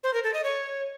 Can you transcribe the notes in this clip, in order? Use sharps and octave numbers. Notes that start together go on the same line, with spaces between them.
C5
A#4
A4
D#5
C#5